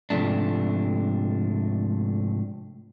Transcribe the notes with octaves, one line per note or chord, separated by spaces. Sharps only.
G#2 C3 F3 A3 D4